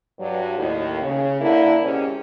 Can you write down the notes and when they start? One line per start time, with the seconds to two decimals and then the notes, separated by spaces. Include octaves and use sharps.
0.19 G2 F#3
0.57 D#2 A2
1.02 C#3
1.41 D3 A#3 E4
1.82 G#2 C3 C#4